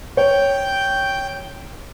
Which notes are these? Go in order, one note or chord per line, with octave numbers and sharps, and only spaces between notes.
C#5 G5